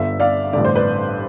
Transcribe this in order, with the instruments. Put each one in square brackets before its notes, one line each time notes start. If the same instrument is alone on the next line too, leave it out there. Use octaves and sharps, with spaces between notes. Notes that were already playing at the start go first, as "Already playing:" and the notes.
Already playing: [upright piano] G1 G2 D3 E5
D5 F5
A1 G2 D3 D5
C5
B4 D5